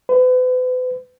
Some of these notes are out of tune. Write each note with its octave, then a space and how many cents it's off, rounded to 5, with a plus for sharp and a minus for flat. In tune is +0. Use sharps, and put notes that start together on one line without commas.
B4 +40